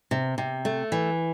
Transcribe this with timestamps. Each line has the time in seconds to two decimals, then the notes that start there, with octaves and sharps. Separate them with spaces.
0.11 C3
0.38 C3
0.65 A3
0.92 E3